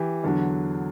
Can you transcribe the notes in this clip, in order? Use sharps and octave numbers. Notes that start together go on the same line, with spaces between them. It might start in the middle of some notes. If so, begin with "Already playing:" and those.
Already playing: E3 G4
E2 D3 F#3